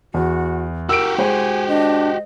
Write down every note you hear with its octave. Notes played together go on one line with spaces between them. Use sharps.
E2 F#4
F#4 G4 A#4 E6 D7
G#3 C5 G#5
D4 D#5